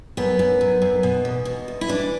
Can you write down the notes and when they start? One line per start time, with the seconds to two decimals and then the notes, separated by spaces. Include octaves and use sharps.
0.17 F#2 B3
0.39 F#2
0.61 F#2
0.82 F#2
1.03 B2
1.25 E2
1.45 B2
1.68 E2
1.81 E4
1.88 E3 D4